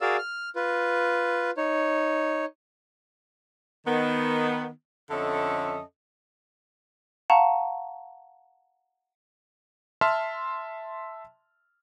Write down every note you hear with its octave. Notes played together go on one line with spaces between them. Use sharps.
F#4 G#4 A#4 D5 F5 E6
F6
F4 B4
D#4 C#5
D#3 B3
F2 D3 C#4 A4 D#5 E5
F5 F#5 A5 A#5 C#6
E5 A5 C6 F6